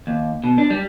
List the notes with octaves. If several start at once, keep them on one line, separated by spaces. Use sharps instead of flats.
D#2
B2
D4
G3